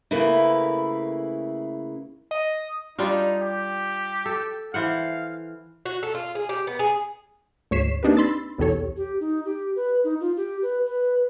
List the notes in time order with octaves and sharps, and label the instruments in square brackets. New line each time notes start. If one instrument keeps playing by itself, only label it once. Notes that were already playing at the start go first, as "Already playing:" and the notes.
[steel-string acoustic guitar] C#3 A3 A#3 E4 B4
[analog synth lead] D#5
[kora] G3 D4 F4 [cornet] D#4
[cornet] G4
[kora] A4
[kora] E3 C5 F#5 [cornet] F5
[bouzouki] F#4
A4
F4
G#4
G4
B3
G#4
[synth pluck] D2 G#2 C#5 B6 C7 E7
A#3 C4 D4 D#4 G4 B4
B5 C6 E6 A6
B1 E2 G4 A4 C#5
[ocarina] G4
D#4
G4
B4
D#4
F4
G4
B4
B4